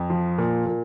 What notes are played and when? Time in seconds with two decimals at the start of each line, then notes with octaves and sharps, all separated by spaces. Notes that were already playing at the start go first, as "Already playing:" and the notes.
Already playing: F2
0.10 F3
0.38 A#2
0.66 A#2